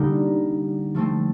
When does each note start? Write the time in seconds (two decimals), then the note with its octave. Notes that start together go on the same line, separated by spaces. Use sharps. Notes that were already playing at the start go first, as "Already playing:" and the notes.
Already playing: D3 G3 A#3 D#4
0.94 F3 A3 C4